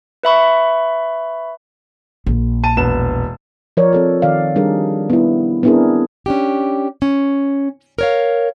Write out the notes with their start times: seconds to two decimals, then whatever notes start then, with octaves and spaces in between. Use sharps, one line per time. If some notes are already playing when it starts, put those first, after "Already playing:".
0.23 B4 E5 B5 C#6
2.26 A#1
2.64 A5 D#7
2.77 E1 B3 E7
3.77 F3 A#4 C#5 D5
3.93 C4 A4 C#5
4.22 D#3 D5 F5
4.56 G3 D4 D#4 G#4 A#4
5.10 B3 E4
5.63 B3 C4 D4 E4 G#4 A#4
6.26 C#4 D4 G4
7.02 C#4
7.98 A#4 C#5 F5